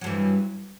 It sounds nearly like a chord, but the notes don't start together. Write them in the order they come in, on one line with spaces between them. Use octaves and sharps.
F#3 G2 E3